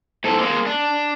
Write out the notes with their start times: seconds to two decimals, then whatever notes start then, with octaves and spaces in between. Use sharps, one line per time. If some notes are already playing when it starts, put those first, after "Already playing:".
0.24 G#2 A4
0.38 G#3 A#3
0.66 D4